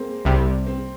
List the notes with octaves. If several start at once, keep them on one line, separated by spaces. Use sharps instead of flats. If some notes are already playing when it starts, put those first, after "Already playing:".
Already playing: G#3 A#3 C4
C2 C3 G3
C4